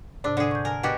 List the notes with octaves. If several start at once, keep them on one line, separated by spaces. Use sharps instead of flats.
G#2 C3 D4
D3 G#4
C#6 G6
A#4 G#5
B2 F#4 G4